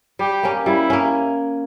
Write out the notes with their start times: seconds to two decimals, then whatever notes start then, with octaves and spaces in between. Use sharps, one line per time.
0.19 G3 G4
0.43 A#3 C#4
0.66 G3 E4
0.90 A#3 C#4